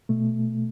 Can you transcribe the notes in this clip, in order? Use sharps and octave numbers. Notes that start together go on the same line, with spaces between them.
B2 A3